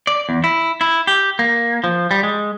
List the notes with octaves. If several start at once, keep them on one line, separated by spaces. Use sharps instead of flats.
D5
E2
E4
E4
G4
A#3
F3
G3
G#3